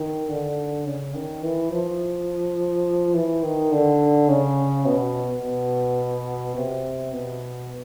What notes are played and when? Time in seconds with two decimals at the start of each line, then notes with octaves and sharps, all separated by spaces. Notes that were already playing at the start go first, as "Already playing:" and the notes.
Already playing: D#3
0.29 D3
0.86 C#3
1.15 D#3
1.43 E3
1.71 F3
3.14 E3
3.43 D#3
3.72 D3
4.29 C#3
4.86 B2
5.42 B2
6.56 C3
7.13 B2